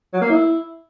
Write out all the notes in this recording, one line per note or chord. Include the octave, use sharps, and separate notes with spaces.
F#3
A#3
E4